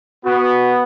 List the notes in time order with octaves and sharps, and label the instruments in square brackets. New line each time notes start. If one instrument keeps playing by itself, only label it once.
[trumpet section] B3 [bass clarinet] F#4